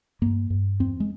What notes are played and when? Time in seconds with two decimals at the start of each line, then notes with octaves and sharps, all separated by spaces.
0.22 G2 A#3
0.50 G2
0.80 E2 C4
1.00 G#3